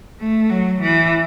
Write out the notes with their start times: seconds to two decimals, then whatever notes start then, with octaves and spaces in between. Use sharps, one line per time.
0.20 A3
0.50 F#3
0.82 E3